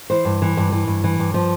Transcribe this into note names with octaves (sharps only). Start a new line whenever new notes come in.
E3 C5
G2
E3
G2
E3
G2
E3
G2
F3